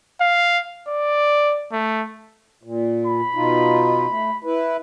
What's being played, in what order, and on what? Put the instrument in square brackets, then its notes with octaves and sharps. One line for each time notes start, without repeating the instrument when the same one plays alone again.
[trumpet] F5
D5
A3
[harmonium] A#2
[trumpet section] B5
[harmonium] B2 D#4 F4
A3
E4 B4